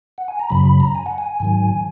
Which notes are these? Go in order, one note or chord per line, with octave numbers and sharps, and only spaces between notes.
F#5
G#5
A#5
F#2 C#3 F#3 B5
B5
A#5
G#5
F#5
G#5
G#2 D#3 F#3